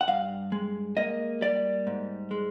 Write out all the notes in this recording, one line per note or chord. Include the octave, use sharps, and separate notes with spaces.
F#5
G2 F5
G#3
A#3 D#5
G3 D5
G#2
G#3